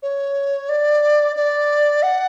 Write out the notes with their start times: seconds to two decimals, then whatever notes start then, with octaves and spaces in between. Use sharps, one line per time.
0.03 C#5
0.69 D5
1.36 D5
2.03 F#5